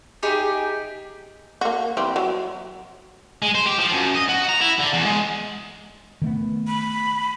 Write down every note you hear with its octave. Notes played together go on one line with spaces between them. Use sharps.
D#4 G4 G#4
A#3 F#4
E3 G3 C4
F#3
G#3
C5
G4
F3
F#2
D#5
F#4
A#5
E4
D3
E2
G#3
D#3 A3 B3
B5